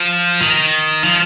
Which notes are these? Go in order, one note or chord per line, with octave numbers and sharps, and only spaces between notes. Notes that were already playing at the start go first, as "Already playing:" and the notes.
Already playing: F3
D#3
F3